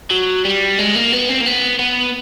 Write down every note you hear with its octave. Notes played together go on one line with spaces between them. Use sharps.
F#3
G3
G#3
A#3
B3
C4
A#3
B3
B3